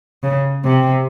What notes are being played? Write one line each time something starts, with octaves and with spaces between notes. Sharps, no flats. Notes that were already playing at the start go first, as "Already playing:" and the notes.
C#3
C3